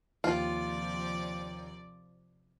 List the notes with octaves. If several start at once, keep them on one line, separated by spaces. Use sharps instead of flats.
D#2 C3 F3 F4 D5